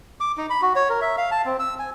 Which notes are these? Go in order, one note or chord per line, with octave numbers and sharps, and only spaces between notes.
D6
D#4
B5
F#4
C#5
A#4
E5
F5
A5
C4
E6
G#5